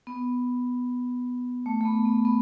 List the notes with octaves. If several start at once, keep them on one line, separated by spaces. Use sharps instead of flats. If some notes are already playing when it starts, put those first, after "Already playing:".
B3
A3
A3
B3
B3
B3